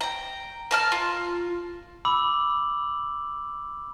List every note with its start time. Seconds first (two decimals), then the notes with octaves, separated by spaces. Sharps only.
0.01 G5 A#5
0.71 A#4 A5 F6
0.92 F4
2.05 B5 D6 E6 F#7